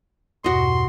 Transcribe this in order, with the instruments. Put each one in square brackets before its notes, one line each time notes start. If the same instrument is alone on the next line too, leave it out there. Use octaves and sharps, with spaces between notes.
[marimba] E2 G2 B2 [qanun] F#4 D#5 [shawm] C6